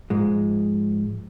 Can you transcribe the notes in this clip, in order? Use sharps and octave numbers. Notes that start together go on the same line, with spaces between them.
G#2 F3 G#3